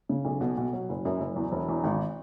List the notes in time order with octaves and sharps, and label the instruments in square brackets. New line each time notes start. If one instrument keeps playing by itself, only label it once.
[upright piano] C#3
B1
B2
B2
F#3
F#1
F#2
F#1
E2
E1
E2
G#1